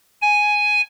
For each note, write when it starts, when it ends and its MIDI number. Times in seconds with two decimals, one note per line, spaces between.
0.22 0.81 80